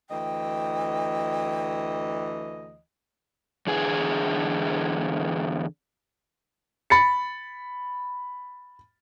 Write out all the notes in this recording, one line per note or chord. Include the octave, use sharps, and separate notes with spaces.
D2 E3 D#5 G5
E2 D3 G#4
B5 A6 C#7